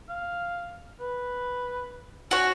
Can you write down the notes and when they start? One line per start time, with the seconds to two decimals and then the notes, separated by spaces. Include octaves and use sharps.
0.09 F5
1.00 B4
2.31 C#4 F#4 C#5